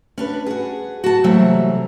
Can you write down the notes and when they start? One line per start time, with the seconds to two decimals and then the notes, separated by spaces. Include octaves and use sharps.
0.18 C#4 D4 B4
0.46 F#4 G#4
1.04 F#4 A5
1.24 C3 E3 F#3 G3 A3 A#3